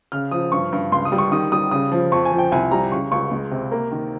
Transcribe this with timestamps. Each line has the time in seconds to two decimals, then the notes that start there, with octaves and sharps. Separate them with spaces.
0.12 C#3 F6
0.31 F3 D#6
0.52 G2 C#6
0.72 G2
0.92 C#2 C6
1.05 D#6
1.12 G3
1.18 C#6
1.32 D#3 D#6
1.52 G3 D#6
1.71 C#3 D#6
1.92 F3
2.12 F2 C#6
2.25 G#5
2.32 F3
2.38 G5
2.52 C2 G#5
2.71 G3 A#5
2.91 C#3 C#6
3.12 C#2 C#6
3.31 G#3
3.51 C3
3.72 A#3
3.92 D#3